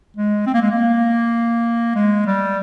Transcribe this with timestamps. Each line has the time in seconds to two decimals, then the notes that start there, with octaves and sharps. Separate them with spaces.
0.16 G#3
0.46 C4
0.54 A#3
0.62 G#3
0.70 A#3
1.95 G#3
2.26 G3